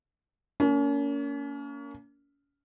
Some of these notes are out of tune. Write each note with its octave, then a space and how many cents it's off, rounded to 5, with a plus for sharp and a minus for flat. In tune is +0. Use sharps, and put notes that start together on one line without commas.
A#3 -10 C#4 +35